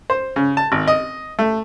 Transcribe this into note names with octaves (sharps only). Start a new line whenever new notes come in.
C5
C#3
A5
G#1
D#5
A3